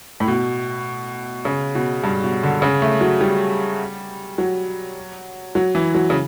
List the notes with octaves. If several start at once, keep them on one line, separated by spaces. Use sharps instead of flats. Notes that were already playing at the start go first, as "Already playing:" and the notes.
A2
B2
C#3
B2
G2
B2
D3
C#3
A3
F#3
G3
F#3
F#3
E3
F#3
C#3